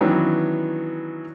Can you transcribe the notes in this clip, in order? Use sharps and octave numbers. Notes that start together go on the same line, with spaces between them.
D#3 E3 F#3 B3 C#4 D4